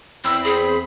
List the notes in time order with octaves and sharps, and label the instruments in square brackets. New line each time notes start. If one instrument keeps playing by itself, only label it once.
[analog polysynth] E2 C4 B5 [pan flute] E6
[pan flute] G#4